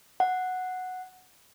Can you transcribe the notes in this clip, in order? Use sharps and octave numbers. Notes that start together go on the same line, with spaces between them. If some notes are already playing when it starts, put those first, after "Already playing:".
F#5